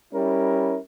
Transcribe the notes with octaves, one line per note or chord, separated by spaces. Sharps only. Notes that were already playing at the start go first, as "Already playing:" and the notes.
G3 C#4 E4 A#4